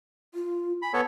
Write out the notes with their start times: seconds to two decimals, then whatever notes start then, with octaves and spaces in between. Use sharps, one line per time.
0.34 F4
0.82 G#5 B5
0.94 B3 A4 C#5